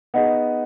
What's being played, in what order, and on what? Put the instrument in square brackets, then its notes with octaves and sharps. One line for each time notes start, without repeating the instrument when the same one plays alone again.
[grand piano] B3 D#4 [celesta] G#4 D#5 F#5